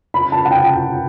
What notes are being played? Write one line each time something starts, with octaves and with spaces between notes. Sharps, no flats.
B5
A5
F#5
G5